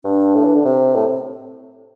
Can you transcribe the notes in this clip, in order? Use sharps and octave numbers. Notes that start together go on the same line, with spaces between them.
G2 D4
A2
E3
D3
C3 C4
A2